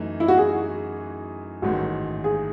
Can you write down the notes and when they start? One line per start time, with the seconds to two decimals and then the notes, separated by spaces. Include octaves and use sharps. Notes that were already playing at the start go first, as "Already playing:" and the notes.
Already playing: F#2 E3 A3 D#4
0.20 E4
0.28 F#4
0.38 G#4
1.62 A1 G#2 D#3 F#4
2.24 G#4